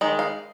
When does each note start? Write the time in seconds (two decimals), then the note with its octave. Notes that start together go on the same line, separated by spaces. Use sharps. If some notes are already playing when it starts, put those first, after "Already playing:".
0.01 D#3 G#3
0.19 F5